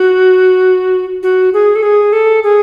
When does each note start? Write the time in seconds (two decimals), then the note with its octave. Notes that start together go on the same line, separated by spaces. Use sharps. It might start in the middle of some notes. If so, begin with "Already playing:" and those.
Already playing: F#4
1.23 F#4
1.54 G#4
1.75 A4
1.83 G#4
2.13 A4
2.43 G#4